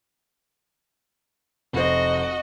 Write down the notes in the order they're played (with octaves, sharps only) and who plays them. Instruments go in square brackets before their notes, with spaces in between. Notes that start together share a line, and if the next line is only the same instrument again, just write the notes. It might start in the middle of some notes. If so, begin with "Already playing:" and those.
[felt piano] F1 C5 [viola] F#4 D#5